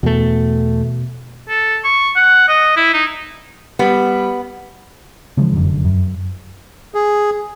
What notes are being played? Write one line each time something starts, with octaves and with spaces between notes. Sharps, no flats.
E2 B2 A3
A4
C#6
F#5
D#5
E4
D#4
G3 B3
C#3 E3 F3 G#3
F1 F#2 D3
F#2
G#4